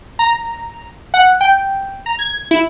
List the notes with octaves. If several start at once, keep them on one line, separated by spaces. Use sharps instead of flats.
A#5
F#5
G5
A#5
G#6
E4